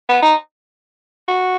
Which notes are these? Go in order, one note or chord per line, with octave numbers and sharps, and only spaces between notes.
B3
D#4
F#4